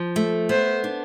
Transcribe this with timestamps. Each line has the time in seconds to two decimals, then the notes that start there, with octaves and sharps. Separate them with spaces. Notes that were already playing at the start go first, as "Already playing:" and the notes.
Already playing: F3
0.16 A3
0.49 B3 C5
0.84 D4